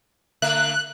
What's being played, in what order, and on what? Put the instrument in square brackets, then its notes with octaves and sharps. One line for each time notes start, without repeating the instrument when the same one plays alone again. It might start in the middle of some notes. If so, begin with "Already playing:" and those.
[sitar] D3 A3 E5 [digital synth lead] F#6